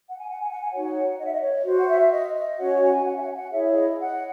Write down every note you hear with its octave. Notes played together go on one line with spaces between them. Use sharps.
F#5
G#5
F#5
G#5
F#5
G#5
D#4 F#4 C#5 F#5
D#5
E5
D#5
C#5
F#4 C5
F#5
E5
D#5
D#5
C#4 F#4 C#5 F#5
G#5
F#5
E5
F#5
G#5
F#5
E4 G#4 C#5 E5
E5
D#5
F#5